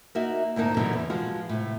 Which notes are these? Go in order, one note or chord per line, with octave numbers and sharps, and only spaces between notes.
A#3 D#4 F#4 E5
D2 G#2 A#3 D#4 A5
G2 B2 D3 E3 F#3 G3
E2
F3 G#3 F4 F#4
A2 C3